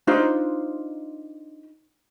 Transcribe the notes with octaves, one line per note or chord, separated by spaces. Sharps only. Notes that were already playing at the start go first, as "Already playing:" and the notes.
D4 D#4 F4 C5